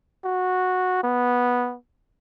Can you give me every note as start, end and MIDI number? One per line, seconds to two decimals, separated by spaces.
0.25 1.00 66
1.03 1.76 59